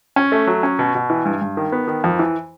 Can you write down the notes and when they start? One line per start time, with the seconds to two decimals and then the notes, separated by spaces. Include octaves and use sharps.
0.16 C#4
0.32 A3
0.47 F#3
0.63 C#4
0.79 B2
0.95 B2
1.10 E3
1.25 G2
1.41 G2
1.57 D#3
1.72 B3
1.87 D#3
2.04 F2
2.19 E3